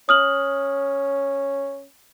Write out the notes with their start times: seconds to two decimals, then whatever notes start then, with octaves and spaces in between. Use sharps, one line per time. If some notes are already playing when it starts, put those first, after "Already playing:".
0.09 C#4 D#6 F6 F#7